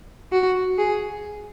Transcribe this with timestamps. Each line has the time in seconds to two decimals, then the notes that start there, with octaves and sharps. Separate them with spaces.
0.32 F#4
0.78 G#4